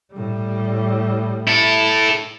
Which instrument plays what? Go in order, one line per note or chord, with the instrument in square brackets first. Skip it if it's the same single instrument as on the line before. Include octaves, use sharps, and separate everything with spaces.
[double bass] A2 G3
[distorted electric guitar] E4 A4